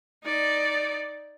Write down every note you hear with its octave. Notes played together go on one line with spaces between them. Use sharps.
D#4 D5